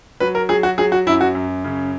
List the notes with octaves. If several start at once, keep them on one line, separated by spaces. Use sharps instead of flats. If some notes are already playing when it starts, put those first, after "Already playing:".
F#3 B4
A#4
F#3 G#4
F#4
F#3 G#4
F#4
F#2 E4
F#4
F#2
C#3